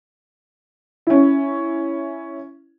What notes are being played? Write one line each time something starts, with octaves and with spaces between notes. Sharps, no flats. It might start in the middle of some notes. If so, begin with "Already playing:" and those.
C#4 E4